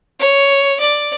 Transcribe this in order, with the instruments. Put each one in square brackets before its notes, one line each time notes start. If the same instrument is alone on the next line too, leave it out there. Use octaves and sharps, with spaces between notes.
[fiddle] C#5
D5